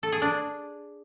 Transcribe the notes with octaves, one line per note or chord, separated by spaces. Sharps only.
A4
G#4
D4